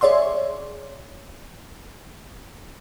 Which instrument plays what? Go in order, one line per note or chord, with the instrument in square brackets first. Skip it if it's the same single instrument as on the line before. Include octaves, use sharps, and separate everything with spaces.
[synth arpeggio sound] G#4 C#5 D5 E5 C6